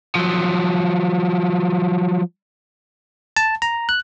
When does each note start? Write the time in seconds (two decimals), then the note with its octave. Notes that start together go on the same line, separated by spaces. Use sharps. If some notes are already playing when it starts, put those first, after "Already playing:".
0.15 F3 F#3
3.37 A5
3.62 A#5
3.89 F#6